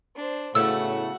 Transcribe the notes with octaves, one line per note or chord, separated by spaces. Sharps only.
D4 C5
A2 C#3 A3 B3 F#4 F#5 E6